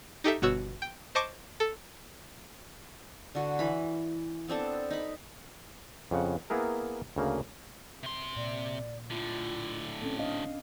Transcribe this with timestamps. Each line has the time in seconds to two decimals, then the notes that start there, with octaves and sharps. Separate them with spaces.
0.24 D#4 G4 A4 E5
0.42 G1 B2 F#4 C#5 E6
0.82 G5
1.15 C5 D#5 A5 C#6 D6
1.60 A4
3.35 D3 F#4
3.59 E3 B5
4.48 B3 C4 D4 A4
4.91 D#4 B5
6.11 F2 C#3 F#5
6.50 A#3 B3 E4 G#4 A#4
7.16 D2 C#3 A#3
8.03 C3 C6
8.36 A#2 D5
9.10 A2 D3 F4
10.02 C4 C#4 A4
10.19 D4 D#5 F5